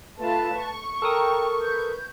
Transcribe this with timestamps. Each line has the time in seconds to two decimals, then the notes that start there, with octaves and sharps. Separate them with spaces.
0.19 A3 F4 B4 A5
0.56 C#6
1.02 A4 A#4 G5 A#5 D#6
1.61 B4 G6